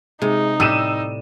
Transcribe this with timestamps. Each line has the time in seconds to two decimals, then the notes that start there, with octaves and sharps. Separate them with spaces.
0.22 C3 G#3 D#4
0.60 A2 G3 G4 E6 D#7 E7